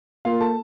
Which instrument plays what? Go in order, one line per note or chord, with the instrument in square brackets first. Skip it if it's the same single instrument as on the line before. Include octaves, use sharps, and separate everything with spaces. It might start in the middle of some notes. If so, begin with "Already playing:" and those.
[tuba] A#3 [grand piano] F4 F5
[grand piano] A4 A5